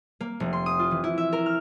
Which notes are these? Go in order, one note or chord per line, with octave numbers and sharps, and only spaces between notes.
A#3
F1
C6
D#6
F4
E3
E4
E5
A#4
F6